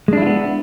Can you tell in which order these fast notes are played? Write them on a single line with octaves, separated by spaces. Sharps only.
G#3 D4 E4 F4 B3